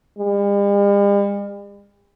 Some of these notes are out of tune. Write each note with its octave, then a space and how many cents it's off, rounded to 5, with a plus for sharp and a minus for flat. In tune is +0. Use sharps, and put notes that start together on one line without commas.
G3 +45